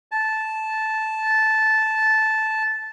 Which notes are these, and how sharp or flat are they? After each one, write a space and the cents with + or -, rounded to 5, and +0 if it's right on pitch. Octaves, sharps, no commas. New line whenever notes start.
A5 -10